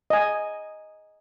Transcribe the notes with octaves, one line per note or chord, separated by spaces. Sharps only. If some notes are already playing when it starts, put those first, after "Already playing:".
D#5 G#5